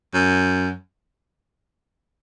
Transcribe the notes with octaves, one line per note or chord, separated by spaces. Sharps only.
F#2